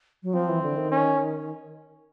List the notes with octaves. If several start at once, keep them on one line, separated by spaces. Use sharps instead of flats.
F#3
F3 C4
E3
D3
D#3
C#4